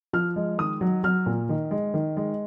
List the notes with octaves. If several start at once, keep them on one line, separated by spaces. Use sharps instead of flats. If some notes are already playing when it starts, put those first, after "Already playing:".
F3 F6
G#3
D#3 D#6
F#3
F#3 F6
A#2
D#3
G#3
D#3
G#3